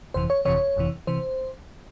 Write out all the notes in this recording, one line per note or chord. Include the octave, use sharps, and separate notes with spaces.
G1 F2 C3 E3 C5
C#5
G1 F2 C3 E3 C#5
G1 F2 C3 E3
C3 E3 C5